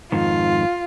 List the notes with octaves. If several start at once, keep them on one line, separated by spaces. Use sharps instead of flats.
F2 G#2 D#3 F4